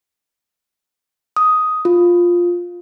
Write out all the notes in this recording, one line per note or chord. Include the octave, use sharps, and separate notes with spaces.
D#6
F4